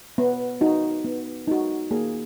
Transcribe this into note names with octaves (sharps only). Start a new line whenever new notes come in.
B3
D#4 F#4
B3
D#4 F#4
A#3 G#4